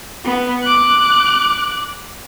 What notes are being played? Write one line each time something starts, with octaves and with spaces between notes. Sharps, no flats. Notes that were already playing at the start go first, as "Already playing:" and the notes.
B3
D6 F#6